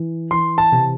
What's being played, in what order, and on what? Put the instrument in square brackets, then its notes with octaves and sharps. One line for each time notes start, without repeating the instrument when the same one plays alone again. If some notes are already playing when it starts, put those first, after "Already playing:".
Already playing: [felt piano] E3
[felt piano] E3 [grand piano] C6
[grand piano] A5
[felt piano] C3